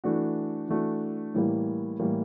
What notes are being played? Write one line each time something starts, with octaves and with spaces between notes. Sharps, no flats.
E3 A3 D4 F#4
E3 A3 D4 F#4
A2 E3 G3 A#3
A2 E3 G3 A#3